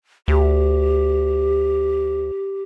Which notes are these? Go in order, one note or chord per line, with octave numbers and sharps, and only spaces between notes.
D2 G4